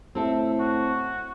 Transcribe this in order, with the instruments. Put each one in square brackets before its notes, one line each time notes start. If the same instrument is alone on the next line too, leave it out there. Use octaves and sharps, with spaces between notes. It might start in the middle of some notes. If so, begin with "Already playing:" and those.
[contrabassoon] A2 [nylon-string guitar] C4 A4 E5
[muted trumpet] F#4